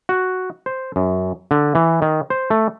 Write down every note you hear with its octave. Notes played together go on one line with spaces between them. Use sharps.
F#4
C5
F#2
D3
E3
D#3
C5
A3